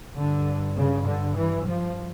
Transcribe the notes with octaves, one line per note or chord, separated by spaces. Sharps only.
G2 D3
C#3
D3
E3
F3